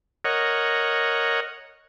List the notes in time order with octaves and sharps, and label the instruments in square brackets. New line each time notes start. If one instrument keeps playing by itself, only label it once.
[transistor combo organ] A#4 C#5 D#5 F#5